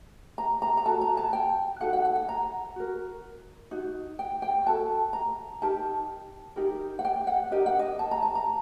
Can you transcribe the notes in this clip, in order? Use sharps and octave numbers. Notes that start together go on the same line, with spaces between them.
A#5
A#5
A#5
F#4 A4 A5
A#5
A5
G5
D#4 F#4 A4 F#5
F#5
F#5
F#5
A#5
F#4 A#4
D#4 F#4
G5
G5
F#4 A4 A5
A#5
D#4 G4 A#4 A5
D#4 G4 A#4
F#5
G5
F#5
D4 G4 A#4 D#5
F#5
D#5
A5
A#5
A5
A#5